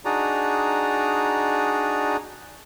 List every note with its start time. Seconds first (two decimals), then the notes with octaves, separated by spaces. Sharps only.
0.05 D4 D#4 F#4 G#4 D5 A#5